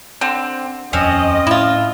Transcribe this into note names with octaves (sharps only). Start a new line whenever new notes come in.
D3 C4
D#1 F2 C4 C#4 D#5
A2 E4 F4